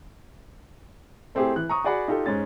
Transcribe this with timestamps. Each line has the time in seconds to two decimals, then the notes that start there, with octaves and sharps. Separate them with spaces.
1.35 A3 C4 E4 G4 G#4
1.56 E3 F#6
1.69 A#5 C#6 D#6
1.84 F#4 G#4 D5 F#5 B5
2.08 D#4 F4 G4 A4
2.26 G#2 G#3 C#4 A6